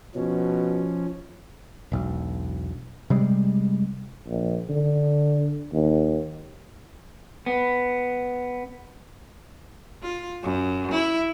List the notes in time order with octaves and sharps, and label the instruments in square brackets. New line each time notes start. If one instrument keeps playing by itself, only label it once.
[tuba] B2 [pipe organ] F3 C#4
[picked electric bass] E1 B1
C3 G3 G#3
[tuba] A#1
D3
D#2
[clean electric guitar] B3
[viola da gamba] F4
F#2
E4